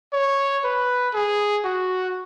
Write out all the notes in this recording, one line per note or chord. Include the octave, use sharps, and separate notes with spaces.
C#5
B4
G#4
F#4